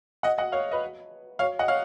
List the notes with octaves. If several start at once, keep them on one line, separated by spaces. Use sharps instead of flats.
D#5 F#5
D#5 F#5
C#5 F5
B4 D#5
C#5 F5
D#5 F#5
C#5 F5